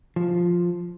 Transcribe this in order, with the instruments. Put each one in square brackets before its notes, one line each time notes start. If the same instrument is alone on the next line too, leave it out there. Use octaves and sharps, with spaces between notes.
[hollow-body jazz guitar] F3